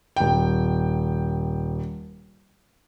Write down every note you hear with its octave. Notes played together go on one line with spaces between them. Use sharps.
D#1 G5